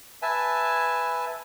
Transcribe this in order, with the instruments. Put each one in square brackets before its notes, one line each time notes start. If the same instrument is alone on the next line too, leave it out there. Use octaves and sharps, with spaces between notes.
[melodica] B4 E5 G#5 A5